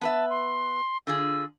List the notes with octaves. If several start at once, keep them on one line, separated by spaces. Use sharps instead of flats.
B3 B4 E5 A5
C6
D3 F4 G#4 E6